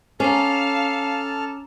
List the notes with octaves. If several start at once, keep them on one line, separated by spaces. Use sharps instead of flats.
C#4 A4 F5 A5 A#5 D6 F6